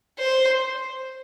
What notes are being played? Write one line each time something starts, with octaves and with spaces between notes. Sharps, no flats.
C5